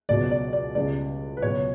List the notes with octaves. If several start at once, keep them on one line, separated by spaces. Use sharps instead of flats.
C#2 B2 F#3 D5
D5
D5
C#2 C#3 G3 D5
B4
C#2 B2 F#3 C#5